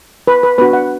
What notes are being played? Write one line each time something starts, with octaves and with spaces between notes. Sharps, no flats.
B4
B4
B3 D4 F#4 B4
F#5